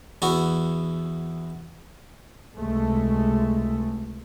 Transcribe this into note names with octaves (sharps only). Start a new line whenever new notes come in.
E2 B3 E4 F#4
C#2 C3 G#3 A3